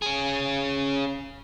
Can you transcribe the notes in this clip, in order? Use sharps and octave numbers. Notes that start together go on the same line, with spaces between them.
C#4 G#4